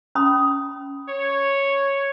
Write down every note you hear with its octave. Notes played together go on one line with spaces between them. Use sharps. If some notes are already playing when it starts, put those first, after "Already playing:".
C#4 B5 D#6
C#5